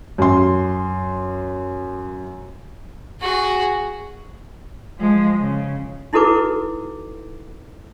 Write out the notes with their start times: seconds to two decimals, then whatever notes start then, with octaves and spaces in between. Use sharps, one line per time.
0.18 F#2 C6
3.21 F#4 G#4
4.99 F3 G#3
5.41 C#3
6.13 D#4 E4 F#4 A4 B4 D6